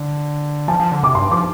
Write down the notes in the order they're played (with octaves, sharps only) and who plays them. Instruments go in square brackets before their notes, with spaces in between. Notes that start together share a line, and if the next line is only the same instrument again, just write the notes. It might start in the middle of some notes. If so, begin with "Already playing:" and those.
Already playing: [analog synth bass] D3
[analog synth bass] F3 [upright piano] A5
[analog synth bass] F3
D3
[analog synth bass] C3 [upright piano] D6
[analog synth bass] G2 [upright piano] C6
[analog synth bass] F3 [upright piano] D6